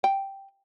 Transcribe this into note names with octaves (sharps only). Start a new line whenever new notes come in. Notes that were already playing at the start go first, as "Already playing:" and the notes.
G5